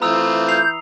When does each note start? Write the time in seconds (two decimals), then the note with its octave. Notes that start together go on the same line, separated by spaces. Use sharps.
0.02 E3 A3 C4 F4 A#5 D#6 E6
0.48 G6 C7 F7